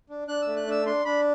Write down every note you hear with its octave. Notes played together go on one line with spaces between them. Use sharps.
D4
D4 F#6
A3 E6
F#6
D4 E6
D4 C6
D4 B5